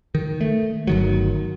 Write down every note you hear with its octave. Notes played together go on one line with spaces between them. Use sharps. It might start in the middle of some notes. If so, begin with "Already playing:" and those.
D#3
A3
G1 D#3 F#3